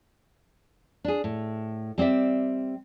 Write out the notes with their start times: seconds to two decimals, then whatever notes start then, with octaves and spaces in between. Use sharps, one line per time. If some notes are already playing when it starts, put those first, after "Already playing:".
1.04 D4 G#4
1.24 A2
1.98 G3 C4 D5 E5